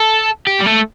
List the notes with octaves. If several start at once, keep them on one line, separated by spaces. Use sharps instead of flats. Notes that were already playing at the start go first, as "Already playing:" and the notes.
Already playing: A4
G4
G3
A3